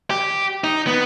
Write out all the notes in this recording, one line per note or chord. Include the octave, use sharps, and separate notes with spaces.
G4
D#4
B3